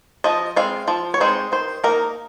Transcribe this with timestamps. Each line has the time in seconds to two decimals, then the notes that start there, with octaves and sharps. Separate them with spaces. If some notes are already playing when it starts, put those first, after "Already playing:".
0.24 F3 D#5
0.56 G#3 C4 F5
0.88 F3
1.14 C#5
1.20 G#3 C4 D#4 C5
1.52 D#3 C5
1.84 A#3 D#4 A#4